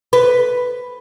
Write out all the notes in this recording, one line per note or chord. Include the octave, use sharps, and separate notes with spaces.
B4